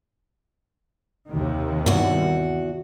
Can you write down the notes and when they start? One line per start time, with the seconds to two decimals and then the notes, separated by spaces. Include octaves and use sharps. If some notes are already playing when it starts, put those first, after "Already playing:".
1.29 D#2 C3 D#3
1.86 E2 G2 F#4